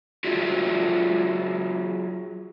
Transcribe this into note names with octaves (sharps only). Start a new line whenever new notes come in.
F#3 F4 F#4 G#4 D5 E5